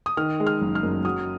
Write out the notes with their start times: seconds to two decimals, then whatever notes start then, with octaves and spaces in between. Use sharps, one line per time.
0.06 D#6
0.17 D#3 F6
0.40 G#3
0.47 F6
0.61 F#1
0.75 F6
0.83 F#2
1.05 F#3 D#6